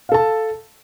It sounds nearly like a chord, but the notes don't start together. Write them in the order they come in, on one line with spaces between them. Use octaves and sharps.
F5 A4 A5